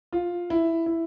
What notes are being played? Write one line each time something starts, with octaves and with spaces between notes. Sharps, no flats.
F4
E4
E4